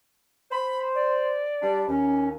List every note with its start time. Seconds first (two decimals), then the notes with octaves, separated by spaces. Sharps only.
0.51 C5 B5
0.95 D5
1.62 G3 D4
1.87 D#2 C#4